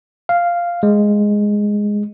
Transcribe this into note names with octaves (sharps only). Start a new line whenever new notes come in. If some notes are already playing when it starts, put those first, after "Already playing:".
F5
G#3